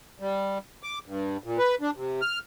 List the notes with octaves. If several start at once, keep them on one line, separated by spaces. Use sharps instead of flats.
G3
D6
G2
A#2
B4
D4
C3
F6